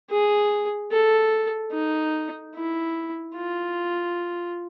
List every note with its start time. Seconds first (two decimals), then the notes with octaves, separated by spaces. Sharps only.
0.11 G#4
0.91 A4
1.73 D#4
2.55 E4
3.35 F4